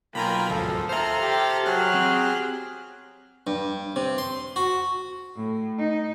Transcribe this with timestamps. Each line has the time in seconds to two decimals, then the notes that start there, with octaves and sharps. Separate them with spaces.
0.15 B1 A#3 F4 G5 G#5 A#5 B5
0.49 G#1 D2 F3 A4
0.89 A4 C5 E5 A#5 C6 F6
1.20 G4
1.66 F#3 G4 G#4 F6 F#6
1.94 C4
3.47 G2
3.96 C3
4.18 C6
4.56 F#4
5.37 A2
5.79 D#4